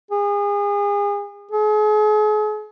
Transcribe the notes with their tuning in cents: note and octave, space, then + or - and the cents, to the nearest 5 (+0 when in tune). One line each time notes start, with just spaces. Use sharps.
G#4 -35
G#4 +40